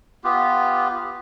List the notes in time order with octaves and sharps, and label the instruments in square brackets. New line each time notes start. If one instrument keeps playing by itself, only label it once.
[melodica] B3 F4 G4